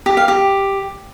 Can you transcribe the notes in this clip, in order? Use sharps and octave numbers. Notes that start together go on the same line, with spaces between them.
G4
F5
G4